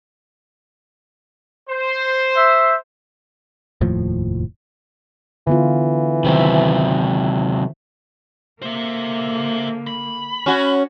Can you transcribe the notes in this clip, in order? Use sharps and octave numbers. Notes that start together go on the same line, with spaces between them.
C5
E5
F1 D#2 A2 F3
D3 E3 B3 F4
C3 D#3 F#3 C5 E5
D3 A#3 C5 E5
B5
C#4 F#4